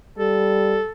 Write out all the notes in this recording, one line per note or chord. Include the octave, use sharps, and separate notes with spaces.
G3 A4